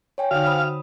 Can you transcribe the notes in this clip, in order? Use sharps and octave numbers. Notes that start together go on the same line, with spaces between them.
C#5 G5 G#5
D3 D#4 F#4 F5
C5 C#5 B5 D#6 E6